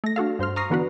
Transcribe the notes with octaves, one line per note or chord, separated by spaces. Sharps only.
A3 A#6
D4 F#4 A4 F5
G2 C5 C6 F6
A#5 C#6 D#6 F6 A#6 C7
D3 E3 B3 D4 F#4 B4